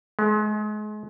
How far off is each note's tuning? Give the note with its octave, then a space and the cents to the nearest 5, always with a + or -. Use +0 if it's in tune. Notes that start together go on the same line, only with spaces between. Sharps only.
G#3 +35